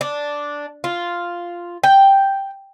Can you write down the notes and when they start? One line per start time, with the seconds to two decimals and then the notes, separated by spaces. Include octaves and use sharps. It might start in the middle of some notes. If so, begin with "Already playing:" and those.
0.01 D4
0.84 F4
1.84 G5